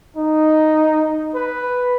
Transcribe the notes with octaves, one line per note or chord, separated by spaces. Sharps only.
D#4
B4